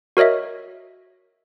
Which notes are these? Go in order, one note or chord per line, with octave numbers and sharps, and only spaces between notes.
F#4 A#4 C#5 D#5 E5